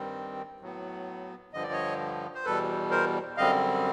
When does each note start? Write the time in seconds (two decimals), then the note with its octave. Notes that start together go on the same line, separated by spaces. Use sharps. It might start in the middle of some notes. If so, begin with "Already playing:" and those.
Already playing: G2 D#3 G3 C4
0.60 A2 F#3 B3
1.53 G2 D3 F3 D#5
1.63 D5
1.72 C#5 D#5
2.34 C5
2.45 E2 B2 G3 A4 B4
2.91 A#4 C5
3.37 F#2 D3 G3 C4 D#5 F5